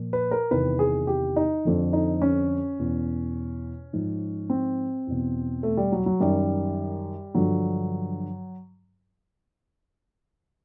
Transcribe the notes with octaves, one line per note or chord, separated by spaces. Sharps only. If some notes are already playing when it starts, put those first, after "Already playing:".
Already playing: A#2 F3
B4
A#4
E2 C3 D#3 B4
G#4
G4
D#4
F2 D3 F3
D#4
C#4
E2 B2
G#2 F3
C4
E2 B2
A3
G3
F#3
F#3
F#2 D#3 G3
G2 D3 F3 F#3